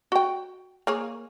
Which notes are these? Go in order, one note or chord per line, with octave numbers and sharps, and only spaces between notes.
F#4 G5
A#3 G#4 C#5